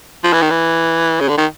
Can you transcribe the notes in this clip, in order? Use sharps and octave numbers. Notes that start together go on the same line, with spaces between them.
F3
E3
D#3
E3
C#3
D3
D#3